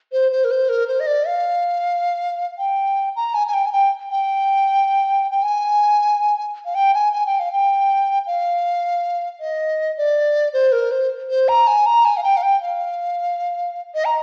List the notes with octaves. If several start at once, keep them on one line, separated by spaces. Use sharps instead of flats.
C5
C5
A#4
C5
A#4
C5
D#5
D5
F5
G5
A#5
G#5
G#5
G5
G#5
G5
G5
G5
G#5
F5
G5
G#5
G#5
G5
F5
G5
F5
D#5
D5
C5
A#4
C5
C5
A#5
G#5
A#5
G#5
F5
G5
F5
G5
F5
D#5
A#5